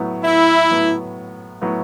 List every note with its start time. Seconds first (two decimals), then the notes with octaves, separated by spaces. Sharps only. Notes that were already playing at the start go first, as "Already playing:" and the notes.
Already playing: A2 F#3 B3
0.24 E4
0.70 A2 F#3 B3
1.62 A2 F#3 B3